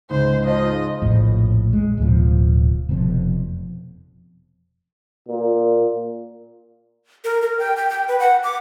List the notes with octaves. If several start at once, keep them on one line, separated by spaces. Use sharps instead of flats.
C#2 G#2 C5
F3 D#5
A#1 F2 A2 F3
G#3
D1 B2 F3
F1 B2 F3
A#2
A#4
A#4
G5
G5
G5
B4
F#5
D6